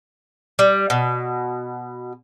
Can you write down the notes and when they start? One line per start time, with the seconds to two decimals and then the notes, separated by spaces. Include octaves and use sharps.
0.59 G3
0.90 B2